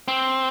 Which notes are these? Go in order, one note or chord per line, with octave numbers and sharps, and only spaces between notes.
C4